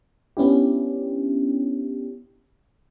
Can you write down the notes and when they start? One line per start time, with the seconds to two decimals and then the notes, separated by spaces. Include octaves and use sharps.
0.37 B3 C#4 D4 E4 G4